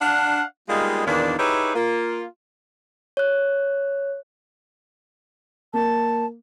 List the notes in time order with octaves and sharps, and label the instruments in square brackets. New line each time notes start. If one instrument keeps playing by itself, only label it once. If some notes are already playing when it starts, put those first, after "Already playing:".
[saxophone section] D4 F5 F#5
G3 G#3 A#3 B3 D#4 F4
E2 A#2 D#3 D4
D#4 E4 G4 G#4 B4 C#5
A#3 F4
[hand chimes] C#5 F#6
[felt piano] A#3 [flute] A5